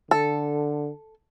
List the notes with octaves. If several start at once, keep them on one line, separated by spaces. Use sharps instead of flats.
D3 A4